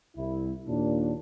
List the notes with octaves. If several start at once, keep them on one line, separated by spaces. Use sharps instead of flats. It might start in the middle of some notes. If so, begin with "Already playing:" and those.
C2 E4
D#2 A#2 D4